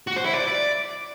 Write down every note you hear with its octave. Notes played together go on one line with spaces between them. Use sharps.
F#4
C5
E4
D5